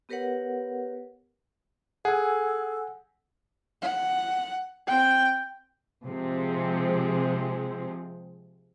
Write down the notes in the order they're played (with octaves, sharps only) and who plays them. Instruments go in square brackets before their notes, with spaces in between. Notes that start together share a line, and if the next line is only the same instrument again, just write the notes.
[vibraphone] B3 G4 A#4 B4 C#5 F#5
[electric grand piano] G#4 [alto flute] A4 [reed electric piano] F#5 G#5
[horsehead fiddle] F#5
[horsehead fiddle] C4 [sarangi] G5
[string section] C3 F3 G#3 C4